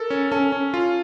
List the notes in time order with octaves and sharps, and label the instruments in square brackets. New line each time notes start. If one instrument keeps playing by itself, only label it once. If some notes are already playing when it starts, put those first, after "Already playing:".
Already playing: [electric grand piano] A4 [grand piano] A#4
[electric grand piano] C#4
[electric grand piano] C#4 [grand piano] A4
[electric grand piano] C#4
F4